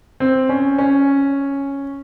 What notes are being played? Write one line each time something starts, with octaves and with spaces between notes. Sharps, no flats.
C4
C#4
C#4